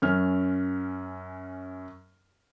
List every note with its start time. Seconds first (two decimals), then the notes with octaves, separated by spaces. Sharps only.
0.02 F#2 C#4 F6